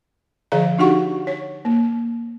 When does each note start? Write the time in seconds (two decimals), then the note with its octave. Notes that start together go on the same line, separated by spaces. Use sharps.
0.52 D3 F3 G#4 D5 F5 A#5
0.79 D4 D#4 F#4 G4 F#5 C#6
1.27 C#5
1.65 A#3